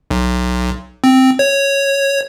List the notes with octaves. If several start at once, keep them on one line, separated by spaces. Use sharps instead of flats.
B1
C4
C#5